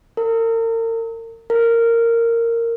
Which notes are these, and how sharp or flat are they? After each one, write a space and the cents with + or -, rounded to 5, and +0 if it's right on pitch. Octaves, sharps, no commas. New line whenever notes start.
A#4 -40
A#4 -10